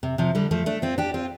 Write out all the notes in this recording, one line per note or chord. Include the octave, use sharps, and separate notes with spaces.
C3
C3 F3
D3 G3
F3 A3
A3 D4
C4 F4
D4 G4
C4 F4